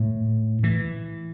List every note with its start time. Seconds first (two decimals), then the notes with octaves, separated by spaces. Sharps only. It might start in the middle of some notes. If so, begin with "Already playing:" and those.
Already playing: A2
0.63 E3